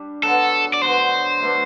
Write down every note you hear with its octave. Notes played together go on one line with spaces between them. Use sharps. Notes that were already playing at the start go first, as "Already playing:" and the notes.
Already playing: G3 D4
D3 F#3 B3 F#4 A4
D5
D3 F#3 B3 F#4 C5
B2 A3 D4